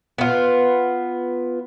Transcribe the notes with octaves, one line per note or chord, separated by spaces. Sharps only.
B3 F4